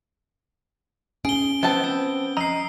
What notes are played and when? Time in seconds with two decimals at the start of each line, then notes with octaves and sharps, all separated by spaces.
1.25 C#4 G#4 D7 G7
1.63 F3 B3 C4 G5 A5
1.84 C4 G7
2.37 F2 D#5 A#5 E6 C7